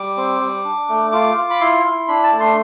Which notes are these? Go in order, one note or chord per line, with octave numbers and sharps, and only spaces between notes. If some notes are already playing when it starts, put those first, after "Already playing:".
Already playing: G3 D6
C4
G3
D4
A3
F4 D6
F4
B5
E4 C6
E4
D4 B5
A5
A3
C6